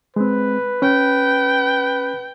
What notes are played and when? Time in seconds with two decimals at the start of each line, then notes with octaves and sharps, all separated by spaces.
0.16 G#3 C4 B4
0.82 C#4 G5